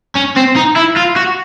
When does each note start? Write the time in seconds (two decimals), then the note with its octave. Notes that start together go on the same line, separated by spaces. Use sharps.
0.16 C#4
0.37 C4
0.56 D#4
0.76 E4
0.96 F4
1.16 F#4